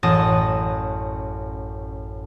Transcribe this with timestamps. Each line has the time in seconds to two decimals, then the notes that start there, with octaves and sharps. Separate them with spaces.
0.03 A1 F#2 A5 D#6 A#6